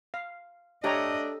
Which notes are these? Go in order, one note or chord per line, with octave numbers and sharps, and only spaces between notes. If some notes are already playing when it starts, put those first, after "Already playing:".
F5
A3 D4 G4 C#5 D#5 A#5